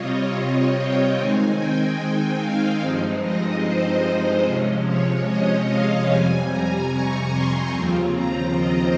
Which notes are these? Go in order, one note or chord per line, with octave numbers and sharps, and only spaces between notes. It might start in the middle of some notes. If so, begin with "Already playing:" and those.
Already playing: C3 G3 C4 F4 C#5 D#5
D#5
G5
D#3 G#3 C4 D#4 G#5
G5
F5
G2 F3 G#3 C4 D#4
D#5
C5
C3 F3 G#3 C#4
C#5
D#5
F5
F2 C3 G3 G#5
A#5
C#6
C6
D#2 C#3 F3 C4 F4
A#5
D#5